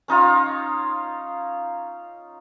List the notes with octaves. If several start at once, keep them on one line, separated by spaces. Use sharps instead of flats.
C#4 D#4 F4 C#5